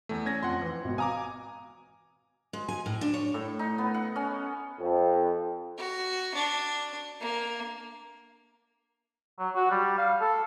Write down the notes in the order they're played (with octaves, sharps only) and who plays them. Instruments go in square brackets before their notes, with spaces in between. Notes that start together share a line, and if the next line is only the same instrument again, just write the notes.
[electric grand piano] E2 A3
C#4 G#6 A#6
[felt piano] F2 [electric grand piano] F#5 C6
[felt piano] E3
G#1 B2
[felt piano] F5 D#6 [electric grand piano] G#5 A#5 D6
[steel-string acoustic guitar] G#3
G#5
A2
D4
C#5
[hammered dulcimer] A2
D#4
B3
F#5
C#4
[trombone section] F2
[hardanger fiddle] F#4
D4
A#3
[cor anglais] F#3
F#4
G3
F5
A4